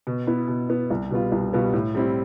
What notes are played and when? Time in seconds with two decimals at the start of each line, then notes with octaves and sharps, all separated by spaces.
0.07 B2
0.27 B3 E4
0.48 B2
0.69 B3 E4
0.91 C2
1.11 B2 G3 B3 F4
1.32 C2
1.53 B2 G3 B3 F4
1.73 A2
1.95 G3 C4 E4